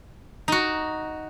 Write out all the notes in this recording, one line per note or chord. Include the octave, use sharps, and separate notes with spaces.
D#4 F#4